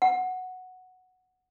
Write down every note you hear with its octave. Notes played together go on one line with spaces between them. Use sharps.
F#5